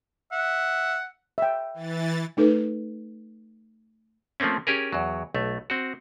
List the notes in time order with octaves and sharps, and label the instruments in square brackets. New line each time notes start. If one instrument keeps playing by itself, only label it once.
[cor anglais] E5 [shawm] F#5
[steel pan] E5 G5
[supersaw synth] E3 A6
[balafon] A3 D#4 A4 B4
[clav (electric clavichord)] F3 A3 A#3 C4 C#4
C#4 G4 G#4 A#4
E2 F#3
B1 A3
C4 F#4